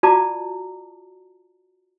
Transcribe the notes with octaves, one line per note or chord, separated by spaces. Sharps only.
F4 F#4 D5 A5 A#5 D6